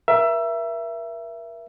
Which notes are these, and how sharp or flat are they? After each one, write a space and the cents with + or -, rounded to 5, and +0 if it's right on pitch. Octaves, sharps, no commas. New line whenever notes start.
A#4 +35 E5 +20